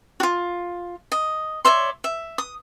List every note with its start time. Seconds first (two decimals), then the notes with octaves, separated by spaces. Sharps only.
0.20 F4 F#4
1.12 D#5
1.65 C#5 D5 E5 C6
2.04 E5
2.38 D#6